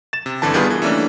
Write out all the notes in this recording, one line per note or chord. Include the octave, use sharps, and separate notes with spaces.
A6 E7
C3
G1 D3 E3 A5
D#3 G3 B3 F4 G#4 B4
E3
E3 G3 A3 A#3 C#4 D4